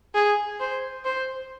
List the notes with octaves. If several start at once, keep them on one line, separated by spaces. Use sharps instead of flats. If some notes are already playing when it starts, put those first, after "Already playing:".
G#4
C5
C5